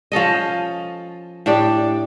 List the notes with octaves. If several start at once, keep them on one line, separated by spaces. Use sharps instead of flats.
F3 C#4 A4 D#5
A2 D4 G4 D5